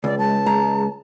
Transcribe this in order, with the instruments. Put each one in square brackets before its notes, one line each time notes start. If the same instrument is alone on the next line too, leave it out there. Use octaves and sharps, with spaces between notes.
[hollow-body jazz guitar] C#2 [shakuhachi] D5
[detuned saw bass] G#3 [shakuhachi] A5
[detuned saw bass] G#3 [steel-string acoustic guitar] A#5